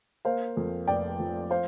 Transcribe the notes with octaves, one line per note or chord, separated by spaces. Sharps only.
A#3 C5 F5
F2
F1 D5 G5
F3
C5 F5